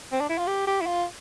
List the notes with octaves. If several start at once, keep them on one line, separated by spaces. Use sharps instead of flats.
C4
D4
E4
F4
G4
G4
E4
F4